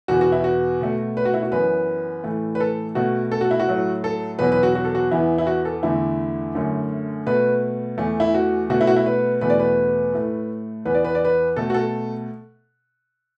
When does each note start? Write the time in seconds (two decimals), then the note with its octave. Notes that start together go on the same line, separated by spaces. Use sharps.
0.08 E2 B2 B3 F#4
0.21 F#4
0.32 E4
0.44 F#4
0.81 B2 A3
1.17 B4
1.25 F#4
1.34 E4
1.43 F#4
1.52 F#2 E3 B3 B4
2.24 A2 E3 A3
2.55 B4
2.60 A4
2.95 B2 A3 F#4
3.32 A4
3.41 F#4
3.51 E4
3.60 F#4
3.68 A2 F#3 A3
4.04 A4
4.39 E2 B2 F#3 B3 B4
4.52 B4
4.63 F#4
4.75 F#4
4.85 A4
4.95 F#4
5.11 E2 E3 B3 E4
5.38 E4
5.47 F#4
5.65 A4
5.83 E2 D3 A3 E4
6.55 F#2 D3 A3
7.27 B2 A3 B4
7.98 E2 E3 A3
8.20 E4
8.34 F#4
8.70 B2 A3 F#4
8.81 E4
8.87 F#4
8.96 E4
9.06 B4
9.41 E2 B2 A3 B4
9.50 D5
9.59 B4
10.14 A2 A3
10.85 E2 E3 B3 B4
10.95 D5
11.04 B4
11.15 D5
11.25 B4
11.56 B2 A3 A4
11.70 F#4
11.74 A4